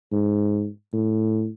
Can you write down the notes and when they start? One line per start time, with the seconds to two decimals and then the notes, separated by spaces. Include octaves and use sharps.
0.12 G#2
0.93 A2